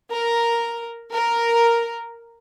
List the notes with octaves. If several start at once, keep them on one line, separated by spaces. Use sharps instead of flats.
A#4
A#4